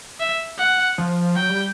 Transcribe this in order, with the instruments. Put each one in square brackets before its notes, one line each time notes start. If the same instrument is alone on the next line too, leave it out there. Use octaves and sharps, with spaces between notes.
[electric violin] E5
F#5
[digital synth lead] F3
[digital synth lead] F#3 [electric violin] G5
[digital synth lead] G3